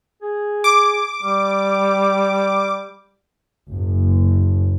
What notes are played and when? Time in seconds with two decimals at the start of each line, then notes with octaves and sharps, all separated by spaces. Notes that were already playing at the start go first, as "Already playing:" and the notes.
0.22 G#4
0.64 D6
1.22 G3
3.70 F#1